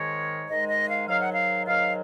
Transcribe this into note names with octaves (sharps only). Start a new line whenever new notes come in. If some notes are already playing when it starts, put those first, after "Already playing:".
Already playing: G#2 D#3 G#3 C#5
G#2 D#3 G#3 D#5
D#5
F5
G#2 D#3 F#3 F5
F#5
F5
G#2 D#3 F#3 F5